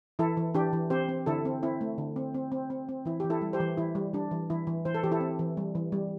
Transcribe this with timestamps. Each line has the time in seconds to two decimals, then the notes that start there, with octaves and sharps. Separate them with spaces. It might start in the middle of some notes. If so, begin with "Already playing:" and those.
0.19 E3 E4 A4
0.37 E3
0.54 E3 D4 G4
0.73 E3
0.90 C4 G4 C5
1.09 C4
1.26 D3 E4 A4
1.45 C4
1.63 C4 E4
1.81 A3
1.98 D3
2.16 C4
2.34 C4
2.52 C4
2.70 C4
2.89 C4
3.05 E3 E4
3.20 E3 G4
3.30 E4 A4
3.42 G3
3.53 G4 C5
3.60 E3
3.77 E3 E4
3.95 G3
4.14 G3 D4
4.31 E3
4.50 E3 E4
4.67 E3
4.85 E3 C5
4.95 A4
5.03 E3 G4
5.12 E4 A4
5.21 C4
5.39 E3
5.57 G3
5.75 E3
5.92 G3